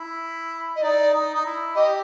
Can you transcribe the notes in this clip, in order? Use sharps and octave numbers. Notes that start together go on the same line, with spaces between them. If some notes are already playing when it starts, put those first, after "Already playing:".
Already playing: E4
D#5
D#4 D5
D#4
D#4
E4
G4 D#5